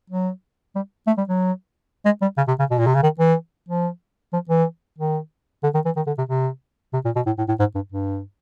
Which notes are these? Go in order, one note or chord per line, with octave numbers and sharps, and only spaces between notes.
F#3
G3
A3
G3
F#3
G#3
G3
C#3
C3
C#3
B2
A#2
C3
C#3
D#3
E3
F3
F3
E3
D#3
D3
D#3
E3
D#3
D3
C3
C3
C3
A#2
B2
A2
A2
A2
G#2
G2
G2